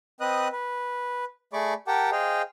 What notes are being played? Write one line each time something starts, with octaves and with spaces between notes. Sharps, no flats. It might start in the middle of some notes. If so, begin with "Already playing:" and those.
C4 B4 D#5 D#6 F#6
B4
A3 G#4 D5 B5 C#6 D6
G4 A#4 F#5 G5 A5 D6
G#4 C5 D#5 F5 G5